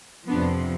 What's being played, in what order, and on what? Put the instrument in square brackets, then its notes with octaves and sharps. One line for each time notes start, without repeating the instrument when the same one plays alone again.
[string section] F2 C3 F3 B3 D4